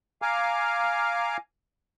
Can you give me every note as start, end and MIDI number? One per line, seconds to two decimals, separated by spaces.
0.22 1.37 77
0.22 1.37 80
0.22 1.37 82
0.22 1.37 86
0.22 1.37 89